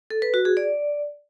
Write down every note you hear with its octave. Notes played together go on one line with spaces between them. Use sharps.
A4
B4
F#4
G#4
D5